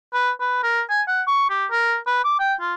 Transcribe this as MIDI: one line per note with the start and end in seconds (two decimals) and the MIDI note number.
0.14 0.30 71
0.40 0.61 71
0.63 0.82 70
0.90 1.02 80
1.08 1.22 78
1.27 1.47 85
1.50 1.66 67
1.71 1.97 70
2.07 2.22 71
2.24 2.37 86
2.39 2.54 79
2.61 2.74 65